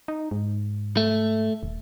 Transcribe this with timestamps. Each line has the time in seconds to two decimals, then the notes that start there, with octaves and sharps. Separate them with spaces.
0.08 D#4
0.31 G#2
0.97 A3
1.63 D#1